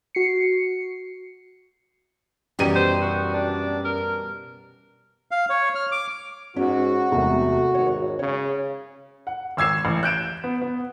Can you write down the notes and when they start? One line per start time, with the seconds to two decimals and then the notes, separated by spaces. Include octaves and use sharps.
0.15 F#4 C7 C#7
2.59 F#2 B2 E3 G3 G4 D#7
2.75 C5
3.02 F#4
3.34 D4
3.85 A#4
5.31 F5
5.50 C#5
5.75 F6
5.92 D6
6.56 G#2 C#4 F#4
7.12 E1 C3 A3
7.75 G#1 C#5
8.19 C#3 C#5
9.27 F#5
9.57 G#1 E6 G#6 C7 E7
9.85 A1
10.03 F#6 G6 D7 E7
10.44 B3
10.62 B3